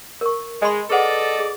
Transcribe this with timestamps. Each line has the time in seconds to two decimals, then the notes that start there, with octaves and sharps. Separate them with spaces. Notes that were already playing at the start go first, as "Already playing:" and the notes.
0.21 A#4 C#6
0.62 G#3 D#5 B5 C6
0.90 G#4 A4 B4 D5 D#5 F#5
1.39 G#4